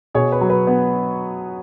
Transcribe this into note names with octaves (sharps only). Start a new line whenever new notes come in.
B2 G#4 C#5
B4
F#3
B4
B3